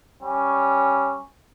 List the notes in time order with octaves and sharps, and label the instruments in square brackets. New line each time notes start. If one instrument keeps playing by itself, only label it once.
[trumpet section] G3 C#4